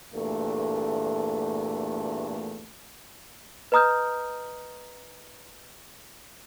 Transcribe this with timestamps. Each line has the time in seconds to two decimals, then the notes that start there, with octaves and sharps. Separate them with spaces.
0.14 E2 G2 A#2 A3
3.72 B4 D#5 A#5 D#6 F6 G6